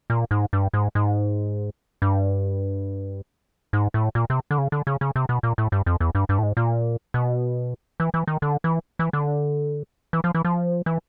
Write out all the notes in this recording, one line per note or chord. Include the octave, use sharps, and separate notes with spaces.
A#2
G#2
G2
G#2
G#2
G2
G#2
A2
A#2
C3
D3
C#3
D3
C#3
C#3
C3
B2
A#2
A2
G2
F2
E2
G2
G2
A2
G#2
A#2
B2
E3
E3
D#3
D3
E3
E3
D3
E3
F3
E3
F3
E3